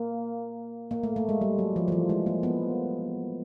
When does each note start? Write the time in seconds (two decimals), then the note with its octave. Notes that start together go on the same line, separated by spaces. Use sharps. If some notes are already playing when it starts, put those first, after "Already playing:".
Already playing: A#3
0.91 A#3
1.03 A3
1.16 A3
1.29 G#3
1.41 G3
1.59 F#3
1.76 F3
1.88 F3
1.92 E3
2.09 G#3
2.26 A#3
2.43 B3